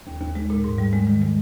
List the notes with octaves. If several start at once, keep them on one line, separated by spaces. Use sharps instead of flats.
D#2
D#2
G#3
A#2
G#2
G3
G#3
D#3
G#3